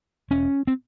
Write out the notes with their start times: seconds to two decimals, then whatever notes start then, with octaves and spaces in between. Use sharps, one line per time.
0.31 E1 C#4
0.67 C4